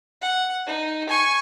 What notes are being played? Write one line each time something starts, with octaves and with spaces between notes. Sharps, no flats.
F#5
D#4
G#5 C#6